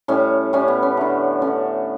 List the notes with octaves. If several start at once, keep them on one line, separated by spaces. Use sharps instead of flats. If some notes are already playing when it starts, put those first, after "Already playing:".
A2 G3 C#4
A2 G3 C#4
B3
C#4
D3 A3
D3 A3 C#4